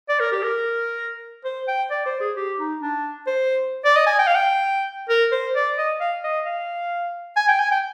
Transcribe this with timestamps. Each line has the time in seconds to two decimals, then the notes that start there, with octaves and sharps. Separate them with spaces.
0.09 D5
0.20 A#4
0.32 G4
0.43 A#4
1.45 C5
1.68 G5
1.91 D5
2.06 C5
2.21 G#4
2.36 G4
2.59 D#4
2.82 D4
3.27 C5
3.85 D5
3.96 D#5
4.07 G#5
4.19 G5
4.27 F5
4.35 G5
5.10 A#4
5.32 C5
5.55 D5
5.78 D#5
6.00 F5
6.24 D#5
6.46 F5
7.37 G#5
7.49 G5
7.60 G#5
7.72 G5